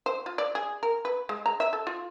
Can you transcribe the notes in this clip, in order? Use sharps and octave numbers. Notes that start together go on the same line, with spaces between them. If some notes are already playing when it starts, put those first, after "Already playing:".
C5
F4
D5
G#4
A#4
B4
G#3
A#5
E5
A4
F4